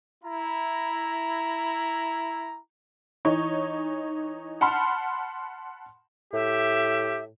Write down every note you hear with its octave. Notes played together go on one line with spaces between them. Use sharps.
E4 A#5
E3 D#4 C#5
F#5 A5 B5 C6 F6
A2 G4 E5